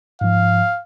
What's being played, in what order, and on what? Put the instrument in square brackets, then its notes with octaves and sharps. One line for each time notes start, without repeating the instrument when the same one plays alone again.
[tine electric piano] G#2 F3 [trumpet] F5